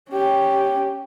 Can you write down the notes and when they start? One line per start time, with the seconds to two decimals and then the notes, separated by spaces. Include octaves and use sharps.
0.11 C#4 G4